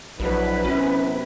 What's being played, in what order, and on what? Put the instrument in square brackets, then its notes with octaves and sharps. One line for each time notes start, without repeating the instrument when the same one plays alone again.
[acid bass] A#1 [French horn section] F#3 D4 [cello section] E4 B4
[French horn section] F#2 C3 B3 [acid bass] C#4